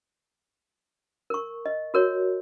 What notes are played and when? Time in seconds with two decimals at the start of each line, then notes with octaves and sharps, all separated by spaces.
1.30 A#4 C#6
1.66 D#5
1.94 F#4 A#4 C#5